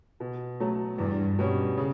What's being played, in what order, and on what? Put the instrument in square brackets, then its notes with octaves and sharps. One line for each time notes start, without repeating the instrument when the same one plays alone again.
[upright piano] B2
F#3 A3
[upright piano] E2 [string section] G2
[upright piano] B2 G3 C#4
C#3